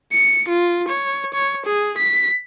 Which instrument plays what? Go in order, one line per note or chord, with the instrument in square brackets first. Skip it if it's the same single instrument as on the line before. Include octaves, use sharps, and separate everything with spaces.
[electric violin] C#7
F4
C#5
C#5
G#4
B6